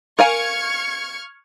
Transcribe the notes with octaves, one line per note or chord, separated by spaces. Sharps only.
A#4 F5 G#5 C#6 F6 G#6